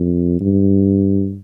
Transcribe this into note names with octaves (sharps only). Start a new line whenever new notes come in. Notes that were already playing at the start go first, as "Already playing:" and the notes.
Already playing: F2
G2